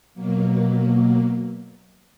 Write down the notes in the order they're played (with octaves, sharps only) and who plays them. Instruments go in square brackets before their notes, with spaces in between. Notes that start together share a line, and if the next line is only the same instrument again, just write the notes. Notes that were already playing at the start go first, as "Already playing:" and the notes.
[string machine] B2 F#3 A#3